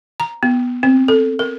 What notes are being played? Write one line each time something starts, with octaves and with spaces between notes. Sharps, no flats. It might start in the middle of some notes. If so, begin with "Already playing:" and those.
A#5
B3
C4
A4
A#4